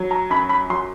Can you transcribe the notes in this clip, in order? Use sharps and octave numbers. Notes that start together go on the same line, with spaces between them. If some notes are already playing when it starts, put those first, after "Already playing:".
Already playing: F#3
A#5
F#2 B5
B5
F#3 C6